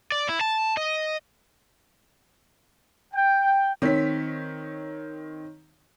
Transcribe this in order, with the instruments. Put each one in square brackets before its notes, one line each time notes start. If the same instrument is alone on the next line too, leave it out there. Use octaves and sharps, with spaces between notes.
[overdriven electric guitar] D5
E4
A5
D#5
[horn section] G5
[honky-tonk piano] D#3 B6 [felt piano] C4 C#5